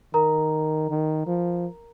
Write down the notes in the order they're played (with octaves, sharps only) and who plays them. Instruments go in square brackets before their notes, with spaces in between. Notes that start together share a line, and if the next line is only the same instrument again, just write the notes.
[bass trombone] D#3 [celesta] A#4 A#5
[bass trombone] D#3
F3